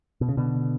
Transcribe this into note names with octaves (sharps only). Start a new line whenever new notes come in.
B2
C#3
B2 D3